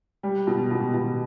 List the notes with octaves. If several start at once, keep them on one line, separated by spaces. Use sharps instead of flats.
G3
B2
B2
B2